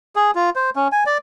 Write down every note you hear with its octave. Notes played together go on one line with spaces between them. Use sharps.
G#4
F4
C5
C#4
G#5
D5